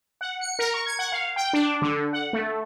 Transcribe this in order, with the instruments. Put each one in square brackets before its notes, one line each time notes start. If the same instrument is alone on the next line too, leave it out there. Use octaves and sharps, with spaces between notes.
[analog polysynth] F#5
C#7
A#4
C#6
G#6
F#5
F5
G5
D4
D3
F#5
A3